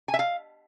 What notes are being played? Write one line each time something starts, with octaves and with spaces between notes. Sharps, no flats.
G#5
E5
F5